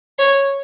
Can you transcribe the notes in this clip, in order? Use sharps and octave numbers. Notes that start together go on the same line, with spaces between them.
C#5